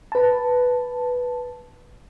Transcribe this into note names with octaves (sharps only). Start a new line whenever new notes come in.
B4 A5